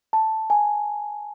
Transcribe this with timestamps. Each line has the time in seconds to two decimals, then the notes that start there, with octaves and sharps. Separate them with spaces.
0.13 A5
0.50 G#5